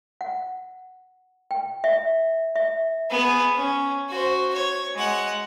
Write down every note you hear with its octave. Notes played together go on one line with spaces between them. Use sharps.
F#5
G5
E5
E5
B3 G#4
C#4
F#4 C5
C#5
G#3 F#5